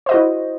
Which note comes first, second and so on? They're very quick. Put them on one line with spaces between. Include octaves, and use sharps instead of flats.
C5 D#5 F#4 E4